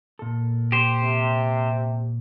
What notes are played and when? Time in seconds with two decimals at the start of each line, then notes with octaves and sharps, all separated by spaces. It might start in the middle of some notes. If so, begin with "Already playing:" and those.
0.19 A#2 A4
0.72 G4 C5
1.03 C3